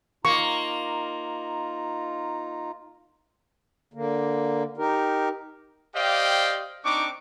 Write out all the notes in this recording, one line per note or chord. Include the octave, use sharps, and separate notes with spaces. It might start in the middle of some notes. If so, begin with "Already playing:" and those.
A#3 D#4 F4 A#5 C#6
D3 A#3
D#4 G4 A#4
G4 C5 D5 D#5 F5 G5
C4 D4 D#4 C#6 D6